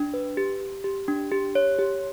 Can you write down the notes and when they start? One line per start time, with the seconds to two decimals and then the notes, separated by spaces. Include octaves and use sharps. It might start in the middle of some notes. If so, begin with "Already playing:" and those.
Already playing: D4
0.14 B4
0.37 G4
0.61 G4
0.84 G4
1.08 D4
1.31 G4
1.55 C#5
1.79 G4